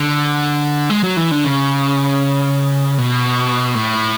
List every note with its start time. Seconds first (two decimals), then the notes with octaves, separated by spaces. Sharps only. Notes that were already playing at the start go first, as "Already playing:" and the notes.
Already playing: D3
0.90 G#3
1.03 F#3
1.17 E3
1.31 D3
1.45 C#3
2.98 B2
3.75 A2